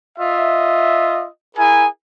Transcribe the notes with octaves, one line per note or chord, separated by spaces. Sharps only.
F4 D#5 E5
E4 G#4 A#4 G#5